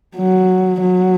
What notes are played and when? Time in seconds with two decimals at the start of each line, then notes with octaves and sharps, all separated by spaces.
0.17 F#3
0.81 F#3